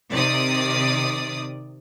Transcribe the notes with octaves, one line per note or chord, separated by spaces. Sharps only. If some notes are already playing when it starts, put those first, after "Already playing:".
C3 D#3 D5 D#6